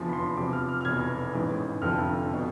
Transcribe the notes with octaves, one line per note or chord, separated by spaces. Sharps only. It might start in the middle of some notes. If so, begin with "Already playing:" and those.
Already playing: F1 E2 D3 F3
B5
C6
E2 C3 F3 D6
F6
F6
F6
F1 E2 B2 G#6
A1 G#2 E3
F1 F2 D3 F3 F6
B2